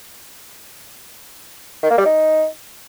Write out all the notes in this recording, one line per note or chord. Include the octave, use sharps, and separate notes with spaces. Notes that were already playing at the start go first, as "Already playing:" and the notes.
D#3
A#3
G3
D#4